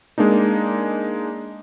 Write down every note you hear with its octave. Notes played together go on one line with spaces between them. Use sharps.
G#3 A#3 D4 D#4